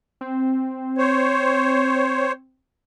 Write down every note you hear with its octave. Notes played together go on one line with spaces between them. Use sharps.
C4
C5 C#5